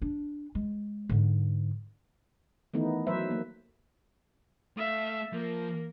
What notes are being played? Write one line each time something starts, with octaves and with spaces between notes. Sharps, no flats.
D4
G#3
G#2 D3
D#3 E3 A3 B3 D#4
F#3 B4 C5 E5
A#3
A3 E5 F5
F3 A#3 A#4